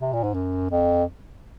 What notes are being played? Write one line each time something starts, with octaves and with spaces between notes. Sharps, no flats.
C3
A#2
G#2
F#2
F2